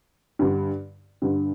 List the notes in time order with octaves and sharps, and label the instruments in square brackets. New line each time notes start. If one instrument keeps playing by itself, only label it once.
[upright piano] G2 D3 G3
G2 D3 G3